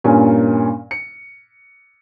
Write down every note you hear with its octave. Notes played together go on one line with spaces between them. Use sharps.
G2 A#2 C#4 A#4 G#5
C#7